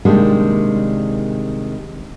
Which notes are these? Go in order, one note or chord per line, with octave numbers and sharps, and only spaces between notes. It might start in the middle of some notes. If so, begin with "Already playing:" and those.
C3 D#3 G3 G#3 A#3 D4